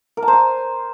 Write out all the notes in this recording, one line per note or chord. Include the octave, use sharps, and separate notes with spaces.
A#4
A5
C5
G#5